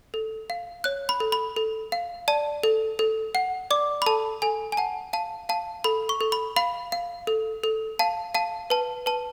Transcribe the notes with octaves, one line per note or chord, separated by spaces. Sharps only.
A4
F5
C#5 F#6
B5
A4
B5
A4
F5
D5 A5
A4
A4
F#5
D5 D6
B5
A4 A5
A4 G#5
G#5
F#5 A5
F5 A5
F5 A5
A4 B5
C#6
A4
B5
F5 B5
F5
A4
A4
F5 A5
F5 A5
B4 A5
B4 A5